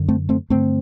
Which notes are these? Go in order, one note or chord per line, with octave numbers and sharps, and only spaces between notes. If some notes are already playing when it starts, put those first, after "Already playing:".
Already playing: F#2 D3
A3 C4
A3 C4
G2 D3 A3 C4